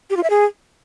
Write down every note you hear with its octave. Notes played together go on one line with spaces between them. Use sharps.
G4
F4
E5
G#4